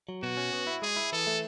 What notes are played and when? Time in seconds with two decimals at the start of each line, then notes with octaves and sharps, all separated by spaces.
0.09 F#3
0.23 B2 F#4
0.37 C#4
0.53 B3
0.67 E4
0.82 G#3 G#4
0.96 E4
1.12 E3 A4
1.27 A3